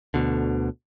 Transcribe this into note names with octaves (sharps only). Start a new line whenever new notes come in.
D2 B2 D3